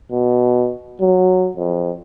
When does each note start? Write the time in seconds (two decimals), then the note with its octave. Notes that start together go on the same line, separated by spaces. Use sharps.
0.12 B2
1.01 F#3
1.57 F2